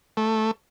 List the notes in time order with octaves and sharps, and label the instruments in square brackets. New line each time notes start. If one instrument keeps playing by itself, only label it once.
[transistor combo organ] A3